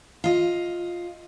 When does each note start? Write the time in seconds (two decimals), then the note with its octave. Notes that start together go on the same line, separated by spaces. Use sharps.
0.24 F4 D#5